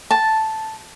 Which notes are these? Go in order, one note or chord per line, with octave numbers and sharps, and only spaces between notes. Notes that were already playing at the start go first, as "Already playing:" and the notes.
A5